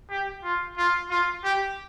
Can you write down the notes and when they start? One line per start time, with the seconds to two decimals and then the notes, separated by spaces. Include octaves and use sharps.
0.10 G4
0.44 F4
0.78 F4
1.10 F4
1.44 G4